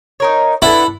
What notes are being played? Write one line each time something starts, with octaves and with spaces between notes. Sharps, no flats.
D#4 A#4 C#5
B3 D4 E4 A4